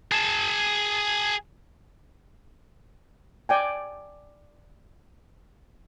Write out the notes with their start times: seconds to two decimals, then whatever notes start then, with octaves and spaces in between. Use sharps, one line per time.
0.12 G#4 A5
3.49 D5 G5 G#5